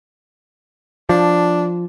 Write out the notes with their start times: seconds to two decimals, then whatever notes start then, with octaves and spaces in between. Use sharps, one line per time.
1.09 F3 D4